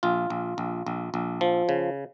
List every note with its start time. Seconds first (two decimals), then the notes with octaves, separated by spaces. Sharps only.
0.03 A#1 F4
0.30 A#1
0.58 A#1
0.87 A#1
1.14 A#1
1.41 F3
1.69 C#3